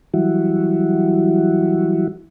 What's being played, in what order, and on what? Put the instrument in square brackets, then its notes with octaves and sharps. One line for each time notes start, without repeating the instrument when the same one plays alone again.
[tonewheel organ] E3 F#3 G3 E4 F#4